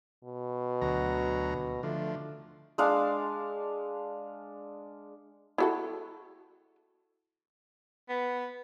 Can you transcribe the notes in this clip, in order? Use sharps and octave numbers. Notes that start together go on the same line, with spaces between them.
B2
D2 F#3 A#5
D3 F3 A3
G#3 D4 F5
E4 F#4 A4
B3